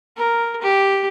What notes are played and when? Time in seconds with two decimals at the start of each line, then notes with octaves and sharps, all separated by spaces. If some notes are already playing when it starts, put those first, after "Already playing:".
0.17 A#4
0.62 G4